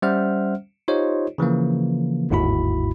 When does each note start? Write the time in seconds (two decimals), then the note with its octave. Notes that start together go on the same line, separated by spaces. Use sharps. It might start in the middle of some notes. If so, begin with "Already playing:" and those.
0.02 G3 C#4 C5 E5 F#5 F6
0.88 D#4 F4 G4 C5 C#5 D#5
1.38 C#3 E3 F3 A#3
2.30 G1 D#2 G#2 E4 F#4 B5